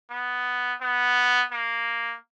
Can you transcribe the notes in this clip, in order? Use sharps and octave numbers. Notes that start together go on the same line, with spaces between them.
B3
B3
A#3